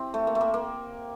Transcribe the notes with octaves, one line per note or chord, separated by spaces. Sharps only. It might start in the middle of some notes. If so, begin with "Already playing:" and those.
Already playing: C4 E4 G4
A3
A#3
A3
A#3
A#3